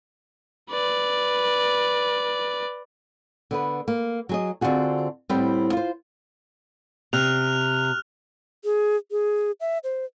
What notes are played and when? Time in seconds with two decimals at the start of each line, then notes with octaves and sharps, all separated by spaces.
0.71 B4 D5
3.51 D3 B3 B4
3.88 A#3
4.29 F#3 G#4 D#5
4.61 D3 C4 F4 F#4 G#4
5.29 A2 G3 B3 C4
5.73 F4 C5
7.13 C3 F6 F#6 F7
8.64 G#4
9.11 G#4
9.61 E5
9.84 C5